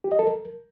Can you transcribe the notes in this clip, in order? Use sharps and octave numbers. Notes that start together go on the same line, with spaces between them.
G4
D#5
A4
A#4